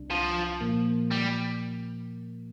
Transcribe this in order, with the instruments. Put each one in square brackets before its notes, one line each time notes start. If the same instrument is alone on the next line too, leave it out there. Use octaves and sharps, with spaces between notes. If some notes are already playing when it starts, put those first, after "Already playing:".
Already playing: [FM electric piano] C2 C3 G3 D4
[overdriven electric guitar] F3
[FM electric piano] A#2 F3 A#3
[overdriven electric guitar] G3